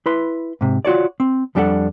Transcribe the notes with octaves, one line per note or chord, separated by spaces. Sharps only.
E4 B4 C6
G#2 C3
F4 F#4 C#5 D5
C4
F2 G3 D4 G4 A4 F#5